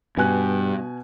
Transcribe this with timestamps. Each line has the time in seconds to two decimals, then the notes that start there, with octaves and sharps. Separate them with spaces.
0.17 G2 B2 G#5 F#6